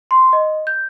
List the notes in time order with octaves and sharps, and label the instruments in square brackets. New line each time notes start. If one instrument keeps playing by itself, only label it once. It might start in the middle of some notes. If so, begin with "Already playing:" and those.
[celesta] C6
D#5
G6